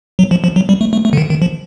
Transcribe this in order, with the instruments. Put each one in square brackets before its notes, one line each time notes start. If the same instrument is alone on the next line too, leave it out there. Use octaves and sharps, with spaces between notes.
[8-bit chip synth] F#3
F3
F3
F#3
G3
A3
A3
A3
D3
D#3
D#3
F3